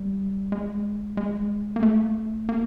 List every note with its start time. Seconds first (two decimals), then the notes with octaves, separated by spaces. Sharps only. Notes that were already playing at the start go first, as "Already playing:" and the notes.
Already playing: G3
0.52 G#3
1.17 G#3
1.76 A#3
1.83 A3
2.49 A#3